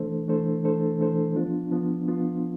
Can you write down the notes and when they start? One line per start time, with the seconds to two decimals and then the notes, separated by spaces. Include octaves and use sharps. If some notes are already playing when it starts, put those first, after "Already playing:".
Already playing: E3 A3 D4 A4 C5
0.28 E3 A3 D4 A4 C5
0.64 E3 A3 D4 A4 C5
0.99 E3 A3 D4 A4 C5
1.35 F3 B3 D4 F4
1.71 F3 B3 D4 F4
2.08 F3 B3 D4 F4